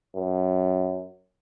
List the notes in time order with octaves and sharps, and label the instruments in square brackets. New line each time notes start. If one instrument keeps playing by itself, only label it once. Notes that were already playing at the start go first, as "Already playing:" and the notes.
[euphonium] F#2